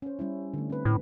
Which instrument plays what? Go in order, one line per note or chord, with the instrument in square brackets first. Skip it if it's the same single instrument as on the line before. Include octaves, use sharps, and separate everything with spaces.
[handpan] C#4 C5
G3 C#4 E4
D3 A3
C4 B4
[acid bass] A2